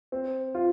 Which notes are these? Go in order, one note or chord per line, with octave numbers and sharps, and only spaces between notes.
C4
F4